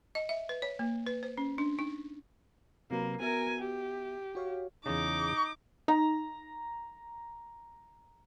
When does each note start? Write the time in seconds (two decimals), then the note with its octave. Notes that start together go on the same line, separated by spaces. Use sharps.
0.15 D#5
0.29 E5
0.49 B4
0.62 C#5
0.79 A#3
1.06 B4
1.23 C5
1.38 C#4
1.58 D4
1.79 D#4
2.91 C3 F#3 A#3 B4
3.20 B3 F#4 A#4 E5 G#5
3.60 G4
4.35 F#4 C#5 F5
4.86 E2 C#3 D#4 D6
5.88 D#4 A#5